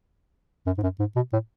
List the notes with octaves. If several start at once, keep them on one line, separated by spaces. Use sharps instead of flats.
F#2
G#2
F#2
G#2
B2
A2